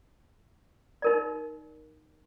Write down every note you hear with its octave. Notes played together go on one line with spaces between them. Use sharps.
D#4 A#4 D5